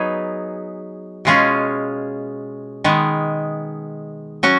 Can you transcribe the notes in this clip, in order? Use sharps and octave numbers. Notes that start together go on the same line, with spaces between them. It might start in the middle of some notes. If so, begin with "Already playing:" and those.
Already playing: F#3 B3 D#4 G#4 B4
B2 G#3 C#4 F4 G#4
D#3 G#3 B3
F#3 C#4 F#4